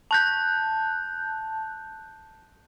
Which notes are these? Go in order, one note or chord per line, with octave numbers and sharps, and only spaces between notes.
A5 F#6 G6